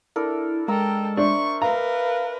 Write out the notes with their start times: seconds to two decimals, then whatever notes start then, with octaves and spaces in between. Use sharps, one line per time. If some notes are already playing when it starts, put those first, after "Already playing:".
0.16 D4 E4 A4 A#4
0.68 G#3 A4 A#4 G5 A#5 E6
1.17 D4 C5 E5 C#6
1.62 A#4 B4 F5 A#5